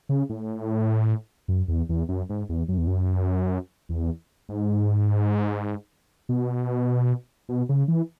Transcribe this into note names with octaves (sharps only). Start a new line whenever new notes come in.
C#3
A2
F#2
E2
E2
F#2
G#2
E2
F#2
E2
F#2
E2
G#2
B2
B2
C#3
E3